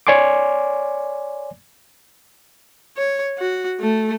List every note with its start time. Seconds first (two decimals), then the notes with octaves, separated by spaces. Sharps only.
0.07 C#5 D5 G#5 C6 D6
2.97 C#5
3.38 F#4
3.80 A3